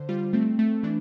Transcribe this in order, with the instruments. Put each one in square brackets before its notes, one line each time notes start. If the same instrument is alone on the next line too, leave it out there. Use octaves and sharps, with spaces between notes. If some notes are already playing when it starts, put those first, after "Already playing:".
Already playing: [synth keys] D3 C5
G3 F4
A3 C4
A3
E3 D4